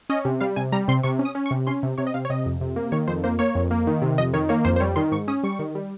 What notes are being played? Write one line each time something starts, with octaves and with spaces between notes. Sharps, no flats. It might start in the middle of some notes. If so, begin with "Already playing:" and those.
C#4 D#5
C3
G3 F5
C3 G#5
G3 A#5
C3 C6
C3 C#6
C#4
D#6
C#4
C#6
C3
C#4 C6
C3
C3 C#5
D#5
C3 F5
C#5
C3 D#5
F2
C3
A#3
D#3 C#5
F2 C5
A#3 C5
A#3 C#5
F2
A#3
D#3
C3
F2 D#5
D#3 C#5
A#3 C#5
F2 C5
C5
G3 C#5
D#3 C6
G#2 C#6
C#4 D#6
G3 C#6
D#3
G3